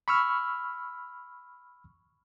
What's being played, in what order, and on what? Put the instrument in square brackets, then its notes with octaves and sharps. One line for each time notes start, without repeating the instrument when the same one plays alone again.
[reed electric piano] B5 C#6 E6 F6